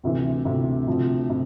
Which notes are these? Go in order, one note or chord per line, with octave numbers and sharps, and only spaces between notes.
D2 C3 E3
D2 C3 E3
D2 C3 F3
C3